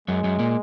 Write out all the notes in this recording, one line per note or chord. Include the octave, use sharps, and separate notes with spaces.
F#2 F#3 G#3
F#2 F#3
A#2 A#3